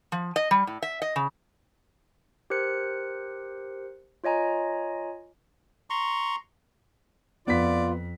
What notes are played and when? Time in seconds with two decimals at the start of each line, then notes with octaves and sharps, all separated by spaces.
0.12 F3
0.36 D#5
0.51 G3
0.67 A2
0.82 E5
1.02 D#5
1.16 C#3
2.50 G4 A#4 C5 F#6 C#7
4.24 F4 C#5 D#5 G#5 A#5
5.90 A#5 C6 C#6
7.47 F2 B3 F4 D5 B6